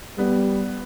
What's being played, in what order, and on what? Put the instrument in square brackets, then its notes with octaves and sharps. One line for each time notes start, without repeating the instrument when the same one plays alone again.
[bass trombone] G3 [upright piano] B3